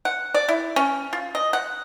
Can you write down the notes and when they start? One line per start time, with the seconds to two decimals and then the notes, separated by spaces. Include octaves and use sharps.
0.05 F#5
0.34 D5
0.49 E4
0.76 C#4
1.13 F4
1.35 D#5
1.53 F#5